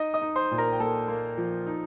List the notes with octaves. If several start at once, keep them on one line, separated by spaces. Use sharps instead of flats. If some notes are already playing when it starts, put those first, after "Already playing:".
Already playing: D#4 D#5 D#6
D#5 D#6
D#4
C5 C6
A#2
A#4 A#5
G5
A#3 A4 A5
A#3
F3
D#4